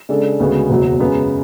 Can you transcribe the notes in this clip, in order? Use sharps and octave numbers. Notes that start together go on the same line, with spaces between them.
C#3 G#3 D4 A4
D2 C#3 G#3 B3 F#4
F#1 E2 B2 F#3
F#2 C#3 G#3 B3